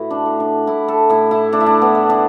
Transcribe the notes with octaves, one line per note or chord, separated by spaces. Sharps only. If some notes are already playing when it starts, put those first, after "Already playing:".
Already playing: A2 E4 F#4 A4 B4
D4
A2
D4
A2 E4
A4
A2 E4
E4
A3 D4
E4
D4
B3
A3
D4